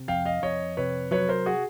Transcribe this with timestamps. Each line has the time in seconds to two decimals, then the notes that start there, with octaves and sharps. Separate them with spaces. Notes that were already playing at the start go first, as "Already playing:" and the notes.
Already playing: C3
0.08 F2 F5 G5
0.25 D#5 F5
0.42 F2 C#5 D#5
0.77 C3 B4 C#5
1.11 F#3 B4 C#5
1.29 A#4 C5
1.46 F#4 G#4